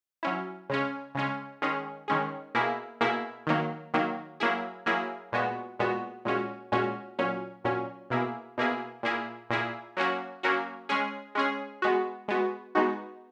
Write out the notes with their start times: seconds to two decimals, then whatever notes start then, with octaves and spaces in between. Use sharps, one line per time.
0.23 F#3 C#4 E4
0.70 C#3 G#3 C#4
1.15 C#3 G#3 C#4
1.62 D#3 G#3 C#4 G#4
2.08 D#3 G#3 C#4 G#4
2.55 B2 A#3 E4 G#4
3.01 B2 A#3 E4 G#4
3.47 D#3 F#3 A#3
3.94 D#3 F#3 A#3
4.40 F#3 A#3 E4 G#4
4.86 F#3 A#3 E4 G#4
5.32 A#2 G#3 B3 F#4
5.79 A#2 G#3 B3 F#4
6.25 A#2 G#3 C#4 F#4
6.72 A#2 G#3 C#4 F#4
7.19 A#2 F#3 C#4
7.65 A#2 F#3 C#4
8.10 B2 A#3 E4 G#4
8.58 B2 A#3 E4 G#4
9.03 A#2 A#3 E4 G#4
9.50 A#2 A#3 E4 G#4
9.97 F#3 A#3 C#4 F#4
10.43 F#3 A#3 C#4 F#4
10.89 G#3 C#4 G#4
11.35 G#3 C#4 G#4
11.82 G#3 B3 F#4
12.28 G#3 B3 F#4
12.75 G#3 B3 D#4 F#4